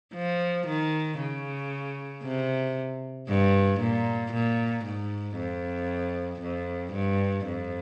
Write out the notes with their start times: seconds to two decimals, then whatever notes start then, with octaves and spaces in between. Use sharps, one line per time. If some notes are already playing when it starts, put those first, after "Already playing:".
0.15 F3
0.67 D#3
1.20 C#3
2.23 C3
3.28 G2
3.80 A#2
4.32 A#2
4.85 G#2
5.36 F2
6.41 F2
6.93 G2
7.45 F2